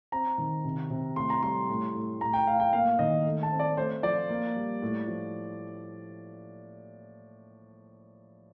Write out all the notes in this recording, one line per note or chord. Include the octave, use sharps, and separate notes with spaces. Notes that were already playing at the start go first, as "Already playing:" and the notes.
C4 A#5
D#3
C3
C3
A2 C6
A#5
G3 C6
A2
A2
A2 A#5
G5
A2 F5
G5
A#3 F5
D#3 D#5
A3
A5
C4
D5
A3 C5
F3 D5
A#3
G3
A2
F3